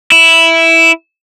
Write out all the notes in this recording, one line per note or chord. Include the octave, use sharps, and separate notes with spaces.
E4